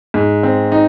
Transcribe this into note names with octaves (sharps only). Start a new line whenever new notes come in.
G#2
C4
D#4